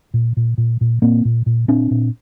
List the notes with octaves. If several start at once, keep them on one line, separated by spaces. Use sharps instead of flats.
A#2
A#2
A#2
A#2
A#2 A#3 C4
A#2
A#2
A#2 C4 D4
A#2